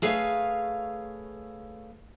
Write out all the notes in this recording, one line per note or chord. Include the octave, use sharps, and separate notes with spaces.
A3 G#4 B4 C#5 F5